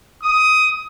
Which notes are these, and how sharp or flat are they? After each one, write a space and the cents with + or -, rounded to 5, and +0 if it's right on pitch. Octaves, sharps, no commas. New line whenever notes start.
D#6 +15